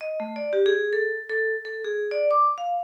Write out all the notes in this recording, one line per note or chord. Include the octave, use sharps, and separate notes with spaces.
D#5
A3
D5
G4
G#4
A4
A4
A4
G#4
D5
D6
F5